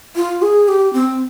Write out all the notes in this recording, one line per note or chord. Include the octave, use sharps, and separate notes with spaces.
F4
G#4
G4
C4